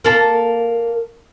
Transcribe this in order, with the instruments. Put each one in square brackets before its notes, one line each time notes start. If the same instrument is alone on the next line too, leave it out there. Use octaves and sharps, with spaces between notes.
[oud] A#3 A4